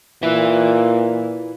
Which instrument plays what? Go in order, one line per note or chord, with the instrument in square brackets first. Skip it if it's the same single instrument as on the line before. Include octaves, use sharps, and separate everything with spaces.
[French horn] A#2 [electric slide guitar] E4 B4 E5